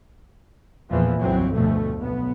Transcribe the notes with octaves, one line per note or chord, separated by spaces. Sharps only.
A1 E2 A#2 E3 F3
G1 C2 F2 E3 F#3 C4
D2 B2 F3 A3
B1 B3